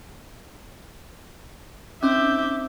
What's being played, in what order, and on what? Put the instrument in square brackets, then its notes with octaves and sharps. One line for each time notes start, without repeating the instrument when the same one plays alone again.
[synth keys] C4 D#4 [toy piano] C#4 [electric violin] E5 G6 [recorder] D6